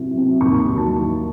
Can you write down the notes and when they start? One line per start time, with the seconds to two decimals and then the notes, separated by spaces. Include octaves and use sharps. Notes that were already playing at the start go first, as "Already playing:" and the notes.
Already playing: C2 C3 F#3
0.14 C3 F#3
0.41 D#2 C#6
0.60 C#6
0.69 D#3 F#3
0.78 A5
0.95 D#2